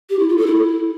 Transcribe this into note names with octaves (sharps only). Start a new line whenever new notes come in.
G4
E4
F4
A4
E4